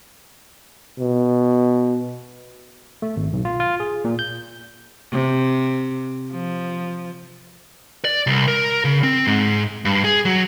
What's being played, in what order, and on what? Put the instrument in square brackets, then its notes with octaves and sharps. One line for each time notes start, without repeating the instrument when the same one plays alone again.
[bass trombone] B2
[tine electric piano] A3
G#1
B1
F4
F4
G#4
A#2
G6
[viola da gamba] C3
F3
[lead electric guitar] D5
C2
A#4
C#3
C4
G#2
G2
G#4
F#3